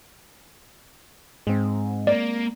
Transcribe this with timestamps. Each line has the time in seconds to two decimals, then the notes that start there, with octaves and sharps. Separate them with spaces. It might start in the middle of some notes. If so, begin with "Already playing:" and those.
1.47 G#2 G#3 C4
2.07 A#3 D5